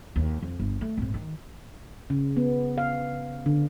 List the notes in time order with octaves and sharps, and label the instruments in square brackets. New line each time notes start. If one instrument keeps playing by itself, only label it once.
[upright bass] D#2
F2
G1
A3
G#1 A2
D#3
[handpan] C#3
B3
F5
D3